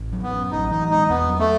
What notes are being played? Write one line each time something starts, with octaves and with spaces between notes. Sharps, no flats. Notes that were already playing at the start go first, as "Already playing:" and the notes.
Already playing: A1
F#3
B3
C#4
A1 D#4
E3 D#4
G#3 D#4
E2 B3
F#3
A3